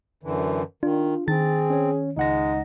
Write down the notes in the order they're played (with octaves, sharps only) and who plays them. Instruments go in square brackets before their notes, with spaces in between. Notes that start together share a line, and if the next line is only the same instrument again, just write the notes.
[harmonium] F#2 D3 E3
[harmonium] D#3 [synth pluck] D4 [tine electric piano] F4
[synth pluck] D#3 [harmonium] C4 [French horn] G#4 [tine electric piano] A6
[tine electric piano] C#4 C#5
[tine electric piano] C#2 F#5 A#6 [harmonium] G#3 [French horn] D#4